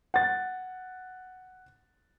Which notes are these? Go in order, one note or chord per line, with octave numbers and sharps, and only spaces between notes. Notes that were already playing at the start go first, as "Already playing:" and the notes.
F#5 A6